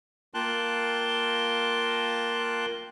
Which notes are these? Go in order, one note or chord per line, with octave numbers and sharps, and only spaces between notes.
A#3 F4 G5 A5 C6 F#6